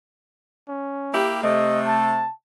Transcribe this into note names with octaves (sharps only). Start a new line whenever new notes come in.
C#4
A#3 E4 G4
C3 A3 D#5
A5